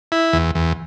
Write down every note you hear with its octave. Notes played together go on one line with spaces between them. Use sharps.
E4
E2
E2